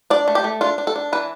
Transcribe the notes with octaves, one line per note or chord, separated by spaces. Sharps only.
D4 D5
A3
G4
A3
D4 F4
D4
A4
D4
E3 B4